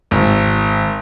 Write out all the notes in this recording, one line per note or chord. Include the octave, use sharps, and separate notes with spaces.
G#1